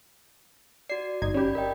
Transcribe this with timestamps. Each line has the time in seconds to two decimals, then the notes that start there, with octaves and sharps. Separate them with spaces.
0.90 F#4 D5 C7
1.22 G1 D#4 G#6
1.34 C#4 G4 D5 B5 G6
1.55 A#4 D#5 G5